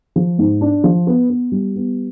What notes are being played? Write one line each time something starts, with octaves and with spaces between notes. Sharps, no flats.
F3
G#2
D4
F3
B3
B3
G3
B3